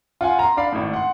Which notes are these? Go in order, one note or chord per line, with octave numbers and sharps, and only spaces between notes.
F4 F#5 G#5 C6
A#5 C6
D4 D5 F5 B5
G#1 A2
F#5 C6